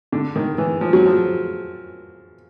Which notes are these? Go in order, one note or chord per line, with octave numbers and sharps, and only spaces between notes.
D3
D#3
E3
F3
F#3
F3